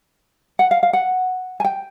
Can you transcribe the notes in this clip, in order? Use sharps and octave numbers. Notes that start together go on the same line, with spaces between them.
F#5
F5
F5
F#5
G#5
G5